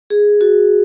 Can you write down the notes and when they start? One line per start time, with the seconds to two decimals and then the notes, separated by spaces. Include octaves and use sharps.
0.10 G#4
0.41 F#4